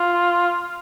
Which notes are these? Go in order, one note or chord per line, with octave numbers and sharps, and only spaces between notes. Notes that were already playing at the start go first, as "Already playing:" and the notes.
Already playing: F4